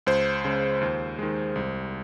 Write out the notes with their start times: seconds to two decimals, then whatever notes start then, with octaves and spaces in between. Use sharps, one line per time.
0.07 C#2 C5
0.45 C#3 G#3
0.81 D#2
1.19 D#3 G#3
1.56 C2